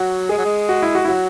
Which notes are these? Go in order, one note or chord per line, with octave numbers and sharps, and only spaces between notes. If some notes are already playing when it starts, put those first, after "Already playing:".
Already playing: F#3 F#4
G#3 G#4
F#3
G#3
F#4
E4
F#4
E4
F#3 F#4